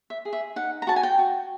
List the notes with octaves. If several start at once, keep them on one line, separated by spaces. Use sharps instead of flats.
E5
G#4
E5
D#4 F#5
A#5
F#4 A5
G#5
G5
F#4